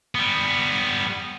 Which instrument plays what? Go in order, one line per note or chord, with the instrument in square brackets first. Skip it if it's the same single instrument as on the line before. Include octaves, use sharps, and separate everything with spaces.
[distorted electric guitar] G3 B3